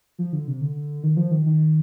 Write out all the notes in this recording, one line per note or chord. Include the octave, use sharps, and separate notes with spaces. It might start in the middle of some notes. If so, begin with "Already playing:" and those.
F3
D3
C3
D3
D#3
F3
D#3
D#3